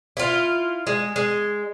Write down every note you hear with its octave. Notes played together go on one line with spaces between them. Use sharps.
E4 F4
G#3
G#3